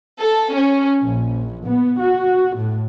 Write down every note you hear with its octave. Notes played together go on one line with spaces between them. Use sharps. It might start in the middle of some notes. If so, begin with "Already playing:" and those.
A4
C#4
A#1
B3
F#4
A2